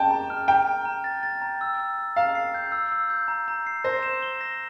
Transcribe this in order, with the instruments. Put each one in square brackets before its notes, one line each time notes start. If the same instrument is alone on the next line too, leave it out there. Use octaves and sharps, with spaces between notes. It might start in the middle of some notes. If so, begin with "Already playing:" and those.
Already playing: [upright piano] G5 A5
[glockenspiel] A#5
F6
[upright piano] G5 [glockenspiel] A#5
[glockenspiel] A#5
A#5
A6
A6
A#5
E6
E6
E6
[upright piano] F5 [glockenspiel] A#5
[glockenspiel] C7
G6
E6
E6
G6
A#5
A#5
C7
[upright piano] C5 [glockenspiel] A#6
[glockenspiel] E7
G7
A#6